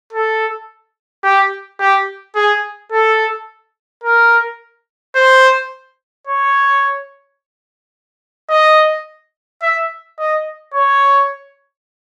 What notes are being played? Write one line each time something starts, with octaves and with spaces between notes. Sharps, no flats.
A4
G4
G4
G#4
A4
A#4
C5
C#5
D#5
E5
D#5
C#5